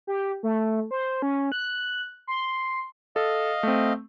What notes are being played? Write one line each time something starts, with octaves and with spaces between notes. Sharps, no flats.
G4
A3
C5
C#4
F#6
C6
A4 D#5 F5
A3 C4